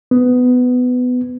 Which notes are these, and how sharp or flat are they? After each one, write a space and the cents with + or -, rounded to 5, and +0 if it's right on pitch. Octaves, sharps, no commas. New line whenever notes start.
B3 +15